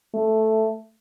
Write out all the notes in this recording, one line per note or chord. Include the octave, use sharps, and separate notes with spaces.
A3